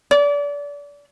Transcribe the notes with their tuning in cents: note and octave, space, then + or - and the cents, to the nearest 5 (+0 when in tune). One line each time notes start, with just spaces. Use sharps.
D5 -30